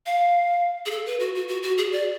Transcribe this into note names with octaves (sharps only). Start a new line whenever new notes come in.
F5
G#4
A4
B4
F#4
F#4
F#4
F#4
G#4
D5